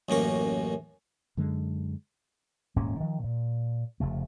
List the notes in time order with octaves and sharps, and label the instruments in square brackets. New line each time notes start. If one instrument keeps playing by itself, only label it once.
[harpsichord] A1 F#2 A#3 C#6
[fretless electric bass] F#2 D3 G#3
[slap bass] D#1 G#2 A#3 C#4
D#3 F3
A#2
F1 C#3 A3